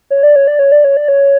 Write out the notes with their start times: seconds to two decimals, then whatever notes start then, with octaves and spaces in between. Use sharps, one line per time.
0.10 C#5
0.23 D5
0.36 C#5
0.48 D5
0.59 C#5
0.72 D5
0.84 C#5
0.97 D5
1.08 C#5